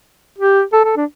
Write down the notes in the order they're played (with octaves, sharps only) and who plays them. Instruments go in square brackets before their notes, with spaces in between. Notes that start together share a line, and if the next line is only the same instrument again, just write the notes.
[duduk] G4
A4
A4
D4